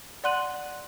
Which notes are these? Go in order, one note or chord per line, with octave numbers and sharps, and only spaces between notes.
D5 F#5 C6 F#6 D#7 F#7